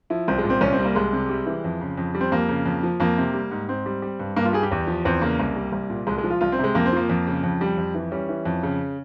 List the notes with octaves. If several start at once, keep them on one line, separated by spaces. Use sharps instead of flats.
F3 E4
C2 C4
G#3
A#2
C4
C2 C#4
C4
G3
A#3
C2 G#3
C3
G3
E3
F2
C#3
F2
G3
C4
F2 A#3
C#3
F2
F3
F2 A#3
C3
G3
G#2
G#2 C4
G3
G3
G2
G2 A#3
F4
G3 G#4
G4
E2
F3
E2 C4
C#3 A#3
C2
G3
C2
A#2
C2 G#3
G#3
F3
F4
C2 F4
C4
C3 G#3
F2 A#3
C4
F3 A#3
F2
C#3
F2
G3
F2
E3
G3 C#4
E3
F2
C#3